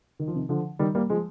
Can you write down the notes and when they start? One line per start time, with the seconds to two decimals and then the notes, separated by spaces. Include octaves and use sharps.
0.19 D#3
0.28 F3
0.35 C3 D#3
0.49 D3 F3
0.79 D#3 G3
0.95 G3 A#3
1.10 F3 G#3